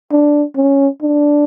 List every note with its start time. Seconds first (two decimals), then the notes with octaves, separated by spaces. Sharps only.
0.12 D4
0.56 C#4
1.03 D4